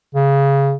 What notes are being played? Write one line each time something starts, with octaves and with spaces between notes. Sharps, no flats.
C#3